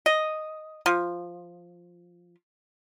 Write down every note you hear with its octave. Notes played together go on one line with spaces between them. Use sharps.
D#5
F3